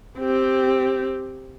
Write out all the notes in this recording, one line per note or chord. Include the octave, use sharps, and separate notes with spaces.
C4 G4